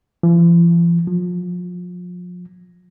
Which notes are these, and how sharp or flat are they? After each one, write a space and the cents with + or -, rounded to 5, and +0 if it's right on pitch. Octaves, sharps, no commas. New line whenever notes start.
F3 -45
F3 +35